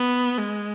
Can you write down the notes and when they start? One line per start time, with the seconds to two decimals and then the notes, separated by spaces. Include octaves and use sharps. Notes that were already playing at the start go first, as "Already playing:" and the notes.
Already playing: B3
0.38 G#3